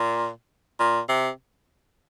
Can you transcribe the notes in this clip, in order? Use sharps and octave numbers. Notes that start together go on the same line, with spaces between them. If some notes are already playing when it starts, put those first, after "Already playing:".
Already playing: A#2
A#2
C3